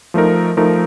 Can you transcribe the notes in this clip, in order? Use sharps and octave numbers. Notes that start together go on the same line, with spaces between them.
F3 A3 D#4 A#4
F3 A3 D#4 A#4